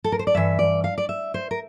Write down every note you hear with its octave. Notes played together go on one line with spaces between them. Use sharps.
A4
A#4
C5
D5
G2 E3 E5
D5
F5
D5
E5
C5
A#4